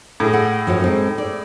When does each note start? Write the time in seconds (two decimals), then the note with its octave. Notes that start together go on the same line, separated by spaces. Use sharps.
0.20 A2 G#4
0.33 F#5
0.67 F#2 F3 F#3
0.82 G#3 C4 D#4
1.18 D5